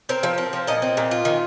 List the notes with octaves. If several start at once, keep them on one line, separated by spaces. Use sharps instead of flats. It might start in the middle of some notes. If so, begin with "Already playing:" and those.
C4 A#4
F3
C4
F3
A#2 D#5
C4
A#2
F4
D#3